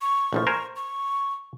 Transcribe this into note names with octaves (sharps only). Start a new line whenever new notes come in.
C#6
A#1 A2 F3
A#4 C5 G#5
C#6